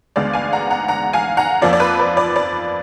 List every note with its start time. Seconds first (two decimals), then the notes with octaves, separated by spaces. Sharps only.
0.16 D2 D3 G#3 B3 D5 F5
0.33 F5 G#5
0.53 F#5 A#5
0.71 F#5 A#5
0.88 F#5 A#5
1.13 F5 G#5
1.37 F#5 A#5
1.62 F2 F3 A#3 D5
1.73 D5
1.80 B4
1.99 B4
2.17 D5
2.36 D5